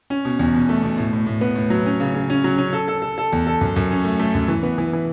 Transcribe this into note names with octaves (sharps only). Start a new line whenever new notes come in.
C#4
B2
E2
B2
A3
B2
A2
A2
A2
B3
A2
F#3
C#4
C#3
C#3
C#4
F#3
C#4
A4
A4
A4
A4
E2
A4
F#2
F#2
C#4
A3
A3
F#2
E3
B3
E3
E3